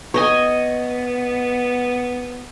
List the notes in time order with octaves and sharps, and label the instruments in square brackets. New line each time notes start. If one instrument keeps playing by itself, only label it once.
[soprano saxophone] B3 [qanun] C#5 D#5 G#5